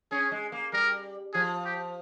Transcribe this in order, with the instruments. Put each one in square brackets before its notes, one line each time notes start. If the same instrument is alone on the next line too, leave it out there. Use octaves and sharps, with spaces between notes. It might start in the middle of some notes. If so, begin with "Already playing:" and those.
[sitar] C#4 [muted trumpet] G#4
[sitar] G#3
A#3
[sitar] G3 [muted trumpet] A#4
[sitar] F3 [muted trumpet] G#4
[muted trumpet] G4